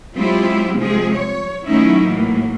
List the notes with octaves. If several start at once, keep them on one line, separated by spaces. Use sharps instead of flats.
F#3 G#3 C4 E4 F4 G4
C3 F3 G3 G#3 C4 G#4
C#5
D#3 F#3 A3 C#4 D#4 E4
A2 E3 F#3 A#3